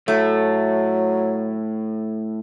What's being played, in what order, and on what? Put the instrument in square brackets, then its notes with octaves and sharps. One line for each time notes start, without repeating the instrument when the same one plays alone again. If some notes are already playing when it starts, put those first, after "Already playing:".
[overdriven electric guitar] A2 [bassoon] F#3 [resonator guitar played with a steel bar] A3